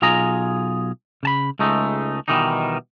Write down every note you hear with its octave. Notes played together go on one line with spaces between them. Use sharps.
B1 F4 G#4 D#5 A#5
C#3 A5 B5
C#2 G#3 A3 D#4
B2 D#3 E3 G3 D#4